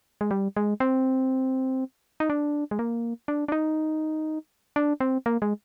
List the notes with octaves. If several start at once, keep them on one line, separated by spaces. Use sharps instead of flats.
G#3
G3
G#3
C4
D#4
D4
G#3
A#3
D4
D4
D#4
D4
C4
A#3
G#3